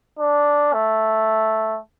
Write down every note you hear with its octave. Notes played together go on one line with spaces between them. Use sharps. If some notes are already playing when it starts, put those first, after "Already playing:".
D4
A3